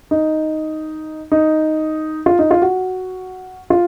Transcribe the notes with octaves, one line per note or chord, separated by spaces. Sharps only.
D#4
D#4
F4
D#4
F4
F#4
F4